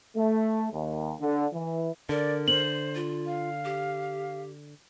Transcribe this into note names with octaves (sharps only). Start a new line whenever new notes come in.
A3
D#2
D3
E3
D3 A#4 D5
C5 F#7
F4
F5
G4